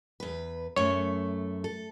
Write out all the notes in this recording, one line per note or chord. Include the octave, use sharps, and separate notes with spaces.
E2 B4
F#2 A3 C#5
A4